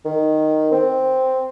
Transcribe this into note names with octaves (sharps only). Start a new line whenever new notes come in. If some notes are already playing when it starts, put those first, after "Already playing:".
D#3
C4